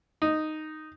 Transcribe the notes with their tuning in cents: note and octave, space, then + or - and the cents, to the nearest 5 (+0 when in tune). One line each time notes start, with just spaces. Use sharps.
D#4 -5